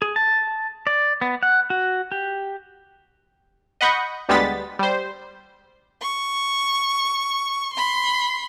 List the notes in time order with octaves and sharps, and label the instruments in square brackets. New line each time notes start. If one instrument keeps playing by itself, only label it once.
[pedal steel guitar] G#4
A5
D5
B3
F#5
F#4
G4
[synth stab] D#5 F#5 B5 C#6 G6
D2 G3 G#3 B3 A6 B6
G3 C5
[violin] C#6
B5 C6